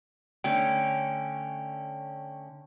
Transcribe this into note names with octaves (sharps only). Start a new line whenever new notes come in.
D3 A3 C#4 G5